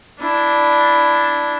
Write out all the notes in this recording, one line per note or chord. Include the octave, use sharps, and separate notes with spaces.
D4 E4